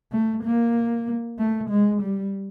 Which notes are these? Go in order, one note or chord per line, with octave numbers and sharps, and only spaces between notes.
A3
A#3
A3
G#3
G3